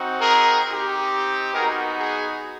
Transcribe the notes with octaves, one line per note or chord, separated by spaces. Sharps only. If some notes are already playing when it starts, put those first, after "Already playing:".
Already playing: C4 D#4 F#4
G#4 A#4
C4 D#4 G4
B3 D#4 F#4 G#4 A#4
G#4